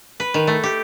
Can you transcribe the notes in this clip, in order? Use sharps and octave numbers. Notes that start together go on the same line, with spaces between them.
B4
D#3
A3
G4